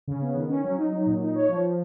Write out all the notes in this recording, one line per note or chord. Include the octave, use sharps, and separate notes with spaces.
C#3
B3
D#3
C#4
F#3
D#4
F#3
A#2
D#4
C#5
F3